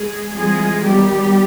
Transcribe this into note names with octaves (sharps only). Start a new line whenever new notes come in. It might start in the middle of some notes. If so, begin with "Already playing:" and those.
Already playing: G#3 G#4
E3 G3 G#3 C4 F4 G#4
D#3 F#3 G3 B3 G4